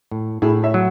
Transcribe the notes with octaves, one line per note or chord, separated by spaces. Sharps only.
A2
A2 E4 G#4
C#5 E5
F#3